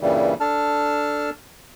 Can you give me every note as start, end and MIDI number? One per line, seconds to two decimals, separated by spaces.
0.01 0.34 43
0.01 0.34 46
0.01 0.34 49
0.01 0.34 52
0.01 0.34 55
0.40 1.30 62
0.40 1.30 69
0.40 1.30 81
0.40 1.30 89